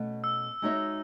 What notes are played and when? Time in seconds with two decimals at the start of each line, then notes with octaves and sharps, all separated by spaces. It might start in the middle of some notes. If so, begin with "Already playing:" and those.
Already playing: B2 A3 C#4
0.24 E6
0.62 G#3 D#4 F#4 C#5 E5